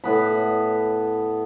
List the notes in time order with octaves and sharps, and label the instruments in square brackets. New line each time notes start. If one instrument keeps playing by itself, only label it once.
[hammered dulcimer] A2 B3 B5